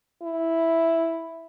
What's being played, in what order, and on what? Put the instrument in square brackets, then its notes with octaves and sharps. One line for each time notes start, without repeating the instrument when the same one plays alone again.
[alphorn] E4